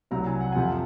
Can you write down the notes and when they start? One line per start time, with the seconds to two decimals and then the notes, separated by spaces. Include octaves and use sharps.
0.11 C2 C3 F#3 A#5
0.27 G#5
0.41 F#5
0.52 G#5
0.55 F2 C3 F3 F#5